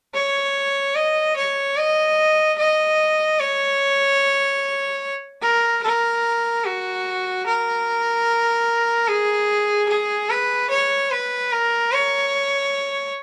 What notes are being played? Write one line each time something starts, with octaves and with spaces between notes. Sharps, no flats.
C#5
D#5
C#5
D#5
D#5
C#5
A#4
A#4
F#4
A#4
G#4
G#4
B4
C#5
B4
A#4
C#5